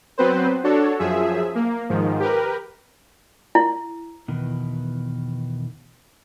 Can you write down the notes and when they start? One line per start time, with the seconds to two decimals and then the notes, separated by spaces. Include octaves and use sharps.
0.18 F#3 B3 C4 B4 C5
0.64 D4 F#4 A4 C#5
0.99 F#2 F3 G#4 E5
1.55 A#3
1.89 G#2 D#3 F3
2.20 G4 A#4 B4
3.55 E4
4.28 E2 B2 D#3